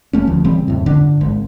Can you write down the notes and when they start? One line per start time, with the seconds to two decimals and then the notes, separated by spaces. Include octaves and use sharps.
0.13 E1 A3 C#4
0.27 D2 F3
0.44 C#3 E3 G3 C4
0.68 F2 A2
0.86 G2 D3 D4
1.21 G#1